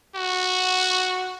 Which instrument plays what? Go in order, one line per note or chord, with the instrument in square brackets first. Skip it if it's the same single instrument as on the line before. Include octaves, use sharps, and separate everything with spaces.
[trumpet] F#4